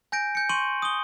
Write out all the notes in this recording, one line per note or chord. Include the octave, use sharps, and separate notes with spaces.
G#5 G6 A#6 D7
G6 C#7
C6 C#6 D#7 F#7
D#6 G7